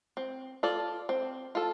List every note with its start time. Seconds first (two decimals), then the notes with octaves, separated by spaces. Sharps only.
0.17 C4
0.63 F4 A4 D5
1.09 C4
1.55 F4 A4